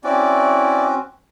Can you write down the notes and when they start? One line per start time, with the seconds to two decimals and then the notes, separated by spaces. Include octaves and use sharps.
0.04 C4 C#4 E4 F#4 D5